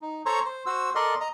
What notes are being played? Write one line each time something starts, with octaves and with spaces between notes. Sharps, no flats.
D#4
A4 C5 C#5 A#5 C#6
C5
F#4 C5 E6
A4 A#4 D5 D#5 C6
D#5 A#5